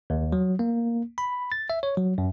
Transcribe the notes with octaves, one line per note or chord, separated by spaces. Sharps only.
D#2
F#3
A#3
B5
A6
E5
C#5
F#3
F#2